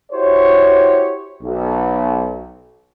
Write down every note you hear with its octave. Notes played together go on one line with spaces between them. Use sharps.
E4 F#4 G4 C5 C#5
B1